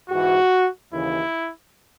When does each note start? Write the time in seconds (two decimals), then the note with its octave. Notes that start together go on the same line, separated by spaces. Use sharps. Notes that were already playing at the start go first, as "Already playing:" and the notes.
0.10 G#2 E3 F#4
0.92 D#2 C#3 E3 E4